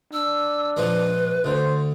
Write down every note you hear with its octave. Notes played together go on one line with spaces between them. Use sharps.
D4 E6
A#2 F3 G#3 B4
D2 D3 C5